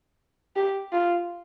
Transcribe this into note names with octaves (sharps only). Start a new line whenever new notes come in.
G4
F4